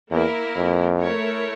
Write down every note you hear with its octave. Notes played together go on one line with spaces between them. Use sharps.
E2 A#3 E4 A#4
F2
A3 E4 A#4 C#5